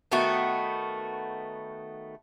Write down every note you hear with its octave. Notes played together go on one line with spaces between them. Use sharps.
D#3 A3 B3 F#4